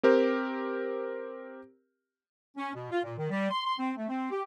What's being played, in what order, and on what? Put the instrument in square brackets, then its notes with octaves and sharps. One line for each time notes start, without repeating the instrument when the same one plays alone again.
[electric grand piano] C4 G4 A#4 C5
[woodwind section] C#4
B2
F4
A#2
D#3
G3
C6
C6
C4
A3
C4
G4